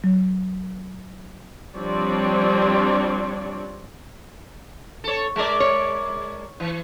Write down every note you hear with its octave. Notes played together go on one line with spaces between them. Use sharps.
F#3
F3 G3 C4 D4 C#5 D5
A4 C#5
G#3 A#4 D5
C#5
E3